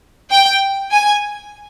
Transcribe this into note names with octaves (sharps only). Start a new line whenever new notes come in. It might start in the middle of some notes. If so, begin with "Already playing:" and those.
G5
G#5